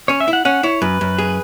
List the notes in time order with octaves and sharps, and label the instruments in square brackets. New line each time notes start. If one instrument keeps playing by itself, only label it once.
[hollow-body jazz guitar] C#4 [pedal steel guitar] C#5
[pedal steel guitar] E5
[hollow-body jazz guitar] E4
[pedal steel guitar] F#5
[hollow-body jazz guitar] C#4 [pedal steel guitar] F#5
[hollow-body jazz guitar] E4 [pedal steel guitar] C#5
[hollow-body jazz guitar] F#2 [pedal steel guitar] B4
[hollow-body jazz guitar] F#2
G#4